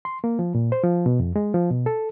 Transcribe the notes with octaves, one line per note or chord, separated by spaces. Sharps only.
C6
A#3
F3
A#2
C5
F3
B2
F2
G#3
F3
B2
A4